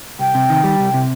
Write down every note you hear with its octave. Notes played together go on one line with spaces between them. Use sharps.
C2 G5
C3
D#3
G3
C2
C3